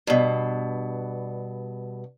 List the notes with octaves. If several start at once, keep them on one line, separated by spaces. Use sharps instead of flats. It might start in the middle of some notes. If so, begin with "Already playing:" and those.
G2 B2